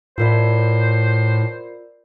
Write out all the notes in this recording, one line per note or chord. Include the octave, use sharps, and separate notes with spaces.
A2 F4 A#4 C5 D5